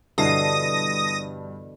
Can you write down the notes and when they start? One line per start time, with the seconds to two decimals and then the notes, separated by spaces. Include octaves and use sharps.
0.18 G2 B2 D3 E3 A5 D#6 A#6 C7